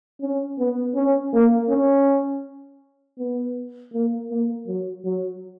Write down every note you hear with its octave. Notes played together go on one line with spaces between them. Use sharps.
C#4
B3
C#4
A#3
C#4
B3
A#3
A#3
F#3
F#3